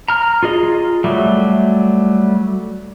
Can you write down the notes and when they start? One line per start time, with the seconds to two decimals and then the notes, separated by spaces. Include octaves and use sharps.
0.08 A#5 F6
0.43 F4 G#4 D#5
1.04 F#3 G3 A3